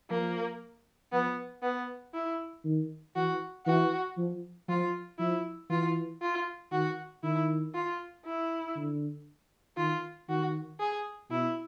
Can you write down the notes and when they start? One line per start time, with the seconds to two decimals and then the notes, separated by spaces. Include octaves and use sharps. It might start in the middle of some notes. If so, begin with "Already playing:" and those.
0.10 F3 A#3
1.12 F3 B3
1.63 B3
2.14 E4
2.65 D#3
3.16 E3 F#4
3.66 E3 F#4
4.18 F3
4.68 F3 F4
5.19 F3 E4
5.70 E3 F4
6.22 F4
6.72 D#3 F#4
7.23 D#3 E4
7.74 F4
8.25 E4
8.76 D3
9.77 D#3 F4
10.29 D#3 F#4
10.80 G#4
11.30 B2 E4